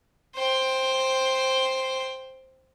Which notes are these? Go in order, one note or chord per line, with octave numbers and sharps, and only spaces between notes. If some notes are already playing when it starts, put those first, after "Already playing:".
C5 G5